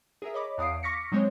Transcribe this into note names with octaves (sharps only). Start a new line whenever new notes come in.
G#4 A#4 E5
C#5 D#5 B5 D6
E2 F5 D#6 C7 D7
C#6 D6 F6 A#6 B6 C#7
F#3 G#3 C4 C5 C#5